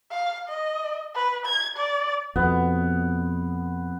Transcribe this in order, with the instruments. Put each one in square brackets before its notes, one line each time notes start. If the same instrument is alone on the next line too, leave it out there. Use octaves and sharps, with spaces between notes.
[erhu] F5
D#5
B4
G#6
D5
[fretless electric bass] F2 B2 [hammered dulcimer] B3